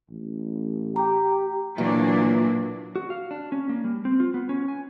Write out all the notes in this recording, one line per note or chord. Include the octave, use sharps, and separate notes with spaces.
A1
G4 A#5
A#2 E3 F#3 A#3 D4
F#4
F5
D4
C#4
A#3
G3
C4
F4
B3
C#4
G#5